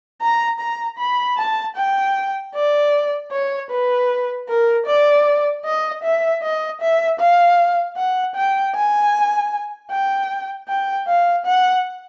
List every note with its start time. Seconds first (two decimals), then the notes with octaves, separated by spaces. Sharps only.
0.22 A#5
0.60 A#5
0.99 B5
1.38 A5
1.77 G5
2.55 D5
3.32 C#5
3.71 B4
4.49 A#4
4.87 D5
5.65 D#5
6.04 E5
6.43 D#5
6.81 E5
7.20 F5
7.97 F#5
8.36 G5
8.75 G#5
9.92 G5
10.69 G5
11.08 F5
11.46 F#5